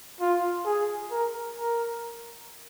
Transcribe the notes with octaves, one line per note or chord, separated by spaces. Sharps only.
F4
G#4
A#4
A#4